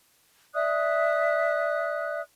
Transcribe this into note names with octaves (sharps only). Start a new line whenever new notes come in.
D5 E5 D#6 F#6